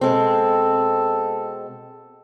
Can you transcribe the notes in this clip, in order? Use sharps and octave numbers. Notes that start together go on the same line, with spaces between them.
B2 G#3 C4 A4